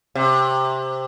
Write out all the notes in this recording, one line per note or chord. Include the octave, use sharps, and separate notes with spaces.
C3